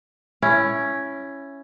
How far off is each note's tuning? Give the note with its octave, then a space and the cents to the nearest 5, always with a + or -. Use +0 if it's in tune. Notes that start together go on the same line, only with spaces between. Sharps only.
C#4 +0 E4 +15